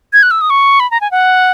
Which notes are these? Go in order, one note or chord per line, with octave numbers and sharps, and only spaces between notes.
G#6
F#6
E6
D#6
C#6
B5
A#5
G#5
F#5